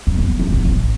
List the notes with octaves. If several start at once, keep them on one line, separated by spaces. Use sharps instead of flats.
F2
G1
E2
A#1
A1